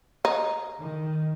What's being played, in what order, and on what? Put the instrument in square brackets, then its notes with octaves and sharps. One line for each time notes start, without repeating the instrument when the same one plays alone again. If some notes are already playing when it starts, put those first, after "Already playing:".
[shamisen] D#4
[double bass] D#3